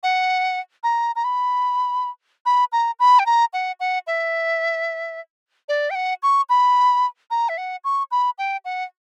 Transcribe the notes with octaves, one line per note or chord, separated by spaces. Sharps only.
F#5
A#5
A#5
B5
B5
A#5
B5
G5
A#5
F#5
F#5
E5
D5
G5
F#5
C#6
B5
A#5
E5
F#5
C#6
B5
G5
F#5